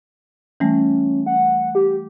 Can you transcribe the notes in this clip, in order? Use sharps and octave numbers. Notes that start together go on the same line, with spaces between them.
E3 G3 A3 C#4
F#5
G4